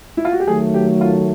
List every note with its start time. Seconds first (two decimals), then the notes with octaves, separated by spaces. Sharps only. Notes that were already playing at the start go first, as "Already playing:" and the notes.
0.17 E4
0.25 F4
0.32 F#4
0.40 G4
0.47 D#3 F#3 A3 G#4
0.74 G4
1.01 F4